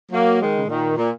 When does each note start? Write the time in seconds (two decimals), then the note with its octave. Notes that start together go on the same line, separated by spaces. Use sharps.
0.11 F#3 A#3
0.40 D#3 G#3
0.57 C#3
0.67 A#2 D#3
0.96 A#2